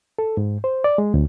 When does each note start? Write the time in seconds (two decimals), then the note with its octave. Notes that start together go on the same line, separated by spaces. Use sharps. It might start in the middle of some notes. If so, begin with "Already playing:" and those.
0.19 A4
0.37 G#2
0.64 C5
0.84 D5
0.98 G#3
1.14 D2